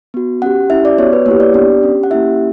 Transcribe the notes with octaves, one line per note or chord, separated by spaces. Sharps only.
B3 F#4
C#4 G4 F#5
C#4 E4 G4 E5
D5
B3 F#4 C#5
B4
A#3 E4 G4 C#5
D5
B3 D4 G4 D5
C#4 G4
F#5
A#3 C#4 E4 G4 E5